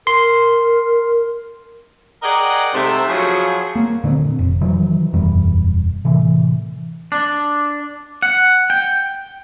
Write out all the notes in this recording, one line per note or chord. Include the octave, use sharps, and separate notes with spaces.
A#4 C6
G#4 A#4 D5 D#5 F#5 G5
G#2 C3 A3 C5 E5
C#3 F3 F#3 F#4 G#4 C5
A#3
A#2 D3 C4
F1
D#3 E3 F#3
E1 F#2 E3 G3
A2 C3 E3
D4
F#5
G5